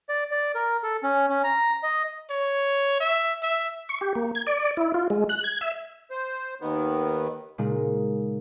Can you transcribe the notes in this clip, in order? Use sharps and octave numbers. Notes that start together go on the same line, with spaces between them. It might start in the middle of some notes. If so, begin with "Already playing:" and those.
D5
D5
A#4
A4
C#4
C#4
A#5
D#5
C#5
E5
E5
C#6
G4
A#3
G#6
D5
E4
F4
G#3
F#6
G#6
E5
C5
D#2 D#3 B3
A#2 C#3 G#3 D#4 G#4